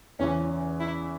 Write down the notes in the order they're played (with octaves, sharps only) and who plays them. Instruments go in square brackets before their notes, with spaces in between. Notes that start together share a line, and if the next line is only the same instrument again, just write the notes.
[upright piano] E2 C#3 E3 [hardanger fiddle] C#4
[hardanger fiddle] E4